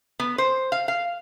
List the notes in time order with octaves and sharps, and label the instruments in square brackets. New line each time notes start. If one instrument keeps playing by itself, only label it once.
[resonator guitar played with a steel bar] B3
C5
F5
F5